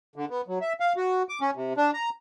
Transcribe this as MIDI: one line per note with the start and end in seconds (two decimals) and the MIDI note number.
0.16 0.25 50
0.30 0.41 59
0.48 0.59 54
0.61 0.73 76
0.80 0.93 77
0.97 1.23 66
1.29 1.39 86
1.41 1.51 61
1.55 1.73 48
1.77 1.91 62
1.94 2.10 82